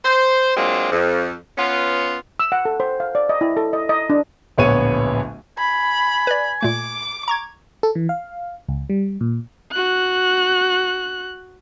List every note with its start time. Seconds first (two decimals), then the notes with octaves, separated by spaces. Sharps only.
0.04 C5
0.56 F#3 G#3 A#3 C4 D4 F4
0.92 F2
1.57 B3 C#4 F4
2.40 E6
2.52 F#5
2.65 A4
2.80 C5
3.00 F5
3.15 D5
3.29 D#5
3.41 E4
3.57 A4
3.73 D#5
3.89 D#5
4.10 D4
4.58 D1 A#1 B3 C#5 C#6 D#7
5.58 G#5 B5
6.27 B4 D5
6.63 A#2 A3 D6
7.28 A#5 C#6 G#6
7.83 A4
7.95 E3
8.09 F5
8.69 C#2
8.90 G3
9.21 A#2
9.72 F#4 F#6